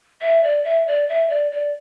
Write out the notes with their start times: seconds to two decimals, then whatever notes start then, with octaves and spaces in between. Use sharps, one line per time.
0.21 E5
0.44 D5
0.65 E5
0.87 D5
1.09 E5
1.30 D5
1.52 D5